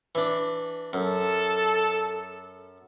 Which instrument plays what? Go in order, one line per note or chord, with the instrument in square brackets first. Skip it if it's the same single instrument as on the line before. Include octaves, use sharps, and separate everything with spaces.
[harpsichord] E3 D4
[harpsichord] F#2 [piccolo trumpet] A4